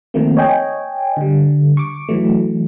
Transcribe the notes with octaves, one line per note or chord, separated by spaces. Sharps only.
D#3 F3 A3 A#3 C4
C#5 D#5 G5 G#5
D3 G3
C#6 D6
E3 F#3 A3